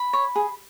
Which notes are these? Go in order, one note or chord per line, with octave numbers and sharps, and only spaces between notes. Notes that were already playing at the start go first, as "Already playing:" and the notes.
Already playing: B5
C#5
G#4